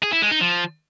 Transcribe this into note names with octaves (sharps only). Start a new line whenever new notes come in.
G#4
E4
G#3
D#4
F3